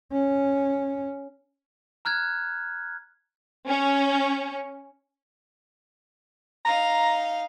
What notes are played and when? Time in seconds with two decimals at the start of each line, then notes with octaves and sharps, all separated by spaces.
0.12 C#4
2.05 A#5 F6 F#6 G#6
3.68 C#4
6.65 D#4 F5 A#5